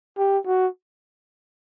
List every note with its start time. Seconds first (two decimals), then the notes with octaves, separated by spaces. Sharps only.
0.18 G4
0.47 F#4